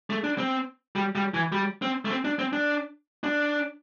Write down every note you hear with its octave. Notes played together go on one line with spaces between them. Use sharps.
A3
D4
C4
G3
G3
E3
G3
C4
A3
C4
D4
C4
D4
D4